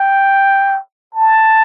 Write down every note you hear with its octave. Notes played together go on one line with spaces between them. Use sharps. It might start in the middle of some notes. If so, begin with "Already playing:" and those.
Already playing: G5
A5